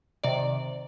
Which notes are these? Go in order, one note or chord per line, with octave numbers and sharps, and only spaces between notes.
C3 D#3 D5